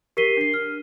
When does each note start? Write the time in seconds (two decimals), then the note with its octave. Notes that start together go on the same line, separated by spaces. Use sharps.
0.17 G4 A#4 B6 C7 D#7 G7
0.37 D4 C7
0.54 F6